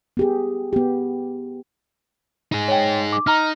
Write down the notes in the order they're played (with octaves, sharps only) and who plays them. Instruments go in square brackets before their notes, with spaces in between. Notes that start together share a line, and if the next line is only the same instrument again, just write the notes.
[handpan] B3 G4 G#4
B3 G4
[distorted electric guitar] D#4 G#4
[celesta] C#5 G5
D6
[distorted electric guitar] D#4 [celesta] A#5 F6